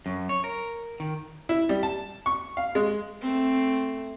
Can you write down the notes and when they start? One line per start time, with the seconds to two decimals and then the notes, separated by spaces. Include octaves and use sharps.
0.06 F#2
0.29 C#5
0.44 A#4
1.00 D#3
1.49 E4
1.69 G3
1.83 A5
2.26 C#6
2.57 F5
2.75 G#3
3.21 A3 C4